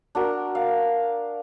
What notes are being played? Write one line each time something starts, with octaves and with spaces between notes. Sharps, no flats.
D4 F#4 A#4
F5